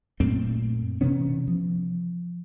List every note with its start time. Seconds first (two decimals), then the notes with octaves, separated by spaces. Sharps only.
0.20 F#2 A#2 A3 C4
1.01 C3 E3 B3 C#4
1.47 F3